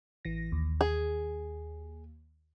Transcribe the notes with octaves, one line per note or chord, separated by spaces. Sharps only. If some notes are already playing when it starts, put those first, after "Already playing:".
A1 E3 A#6
D#2
G#4